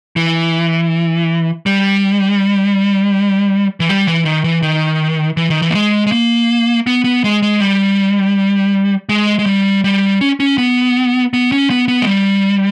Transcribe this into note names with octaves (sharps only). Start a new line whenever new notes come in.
E3
G3
E3
G3
E3
D#3
E3
D#3
E3
D#3
E3
A#3
G#3
G#3
A#3
B3
B3
G#3
G#3
G3
G#3
G#3
G3
G3
C#4
C#4
B3
B3
C#4
B3
B3
G#3
G3